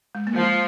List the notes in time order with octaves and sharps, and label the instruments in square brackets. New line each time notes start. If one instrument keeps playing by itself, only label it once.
[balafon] G#3
A#3
[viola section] F3 [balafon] G#3